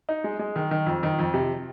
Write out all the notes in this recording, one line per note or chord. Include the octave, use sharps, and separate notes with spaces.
D#4
G#3
G#3
D#3
D#3
F2
D#3
F2
C3